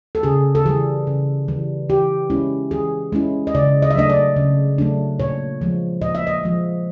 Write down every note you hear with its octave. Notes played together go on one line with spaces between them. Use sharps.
A4
C#3 G#4
A4
E3 G3 G#4
C#3
E3 G3
E3 G4
G#3 C#4 E4
E3 G#4
G#3 C#4 E4
D#5
C#3 D5
D#5
E5
F#3 A3 D4 D#5
D5
C#3
F#3 A3 D4
A#2 C#5
F3 G#3
A#2 D#5
E5
D#5
F3 G#3